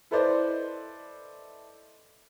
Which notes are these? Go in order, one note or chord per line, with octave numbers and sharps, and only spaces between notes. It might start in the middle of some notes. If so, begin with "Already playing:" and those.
E4 A4 B4 C5 D5 D#5